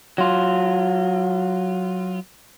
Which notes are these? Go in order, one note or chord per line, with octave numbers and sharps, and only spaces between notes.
F#3 F4